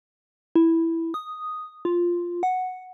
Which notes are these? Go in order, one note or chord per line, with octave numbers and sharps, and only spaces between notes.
E4
D#6
F4
F#5